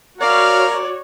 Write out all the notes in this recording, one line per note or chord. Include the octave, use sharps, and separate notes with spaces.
F#4 A#4 C#5 D5 F5